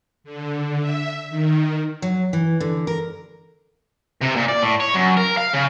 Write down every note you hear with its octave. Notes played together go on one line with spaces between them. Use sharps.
D3
E5
D#3
F#3
E3
D3
A#4
C3
A#2
D5
A2
C#5
F#2
A#4
F5
C#3